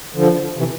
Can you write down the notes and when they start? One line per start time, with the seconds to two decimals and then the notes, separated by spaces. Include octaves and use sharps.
0.14 D3 F3
0.58 C3 E3